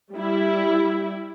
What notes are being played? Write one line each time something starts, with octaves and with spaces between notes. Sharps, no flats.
G3 E4